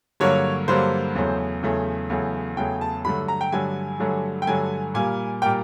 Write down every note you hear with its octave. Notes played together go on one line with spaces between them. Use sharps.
G2 D3 F#3 A#3 C#5
G2 D3 F#3 A#3 C5
E2 C#3 F#3 A3
E2 C#3 F#3 A3
E2 C#3 F#3 A3
E2 C#3 F#3 A3 G5
A5
G2 D3 F#3 A3 B5
A#5
G5
G2 D3 F#3 A3 G#5
G2 D3 F#3 A3
G5
G2 D3 F#3 A3 G#5
A#2 G3 A#3 G#5
A#2 G3 A#3 G5